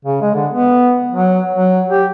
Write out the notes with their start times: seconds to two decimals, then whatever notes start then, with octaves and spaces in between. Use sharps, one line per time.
0.05 C#3
0.22 G#3
0.35 D3
0.53 B3
1.11 F#3
1.56 F#3
1.90 G4